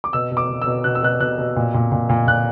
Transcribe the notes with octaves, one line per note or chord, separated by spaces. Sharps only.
D6
B2 E6
B2
D6
B2
E6
B2
B2 F#6
E6
B2 F#6
B2 F#6
B2
A#2
A#2
A#2
A#2
A#2 F#6